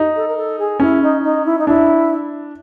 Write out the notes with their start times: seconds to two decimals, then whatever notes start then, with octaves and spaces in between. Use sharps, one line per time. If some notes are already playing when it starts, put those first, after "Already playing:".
Already playing: D#4
0.15 A4
0.27 A#4
0.37 A4
0.58 G#4
0.80 C#4 E4
1.02 D#4
1.23 D#4
1.45 E4
1.58 D#4
1.67 D4 E4